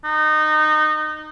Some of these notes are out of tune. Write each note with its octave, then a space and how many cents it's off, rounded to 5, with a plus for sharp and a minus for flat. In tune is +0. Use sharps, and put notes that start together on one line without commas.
D#4 -20